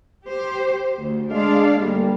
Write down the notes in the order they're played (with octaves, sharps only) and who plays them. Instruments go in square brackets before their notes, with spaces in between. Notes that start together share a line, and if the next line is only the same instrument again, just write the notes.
[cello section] G4 C5
D2
[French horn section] G#3 [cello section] D4 F5
[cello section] G2 A3 A#3 [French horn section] D3 G3